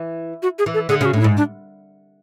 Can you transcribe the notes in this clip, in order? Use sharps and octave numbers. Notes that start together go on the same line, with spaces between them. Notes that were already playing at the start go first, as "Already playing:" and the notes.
Already playing: E3
F#4
G#4
E3
A4
D3 G#4
C#3 F#4 G#4
A2 D4
E4
G#2
D4